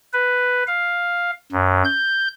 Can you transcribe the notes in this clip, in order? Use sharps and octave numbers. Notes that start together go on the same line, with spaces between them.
B4
F5
F#2
G6